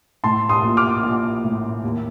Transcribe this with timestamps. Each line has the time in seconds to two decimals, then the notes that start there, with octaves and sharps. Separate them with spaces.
0.24 A2 A5 C6
0.49 C6 D#6
0.64 A#1
0.77 D6 F6
1.03 A#1
1.44 A2
1.83 D#2